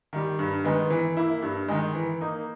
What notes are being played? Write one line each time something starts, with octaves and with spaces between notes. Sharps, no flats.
D#3 G3
G2
D#3 G#3 B3
E3
A#3 E4
G2
D#3 G#3
E3
A#3 D#4